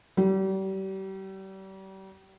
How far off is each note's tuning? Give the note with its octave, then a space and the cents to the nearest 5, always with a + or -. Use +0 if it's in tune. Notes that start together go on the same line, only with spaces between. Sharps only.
G3 -35